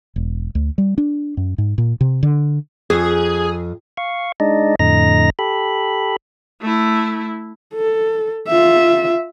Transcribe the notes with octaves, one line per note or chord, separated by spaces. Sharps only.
E1
D2
G3
D4
F#2
G#2
A#2
C3
D3
F2 G#4
F5 C#6
G#3 D4 D#4 D5 D#5
F2 A2 D3 D#5 A#5 A#6
G4 A4 B5
A3 E4
A4
F4 E5